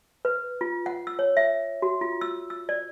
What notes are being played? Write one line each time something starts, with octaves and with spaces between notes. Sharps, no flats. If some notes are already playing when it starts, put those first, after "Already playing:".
B4
F4
F#5
E6
C#5
E5
F#4
F4
E6
E6
D5